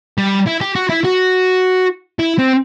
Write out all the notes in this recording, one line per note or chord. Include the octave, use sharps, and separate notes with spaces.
G3
E4
G4
F#4
E4
F#4
E4
C4